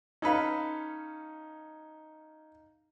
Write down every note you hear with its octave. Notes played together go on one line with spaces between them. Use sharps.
C#4 D#4 A4 B4 F5